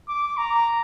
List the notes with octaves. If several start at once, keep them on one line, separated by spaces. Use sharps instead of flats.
D6
A#5